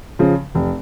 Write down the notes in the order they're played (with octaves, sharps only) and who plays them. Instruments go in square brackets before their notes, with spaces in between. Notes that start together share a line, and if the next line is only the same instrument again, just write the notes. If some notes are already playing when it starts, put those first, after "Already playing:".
[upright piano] C#3 F3
F1